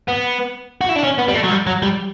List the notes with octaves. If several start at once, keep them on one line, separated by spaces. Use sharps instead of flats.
B3
F#4
E4
D4
C#4
B3
G3
A3
F#3
G3
F#3
G3